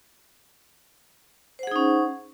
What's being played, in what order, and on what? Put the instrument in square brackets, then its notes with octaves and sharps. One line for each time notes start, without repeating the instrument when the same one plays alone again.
[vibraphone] C5
F#5
G#4
D#4
C#4